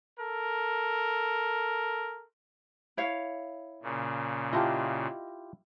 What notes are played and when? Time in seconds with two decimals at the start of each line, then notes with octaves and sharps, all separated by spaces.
0.19 A4 A#4
2.97 E4 C#5 F5
3.83 A#2 C#3
4.53 E4 F4 G4 D#5 A5